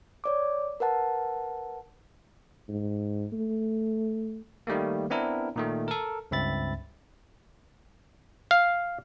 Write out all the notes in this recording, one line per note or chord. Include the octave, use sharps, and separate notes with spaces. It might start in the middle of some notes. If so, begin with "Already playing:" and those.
C#5 D5 D6
A#4 B4 F#5 A5
G#2
A3
D#3 G3 A3 A#3
B3 C4 D4 E4 A#4
A#2 D#3 A3
A4 A#4
C#2 G2 C4 E5 B5 A6
F5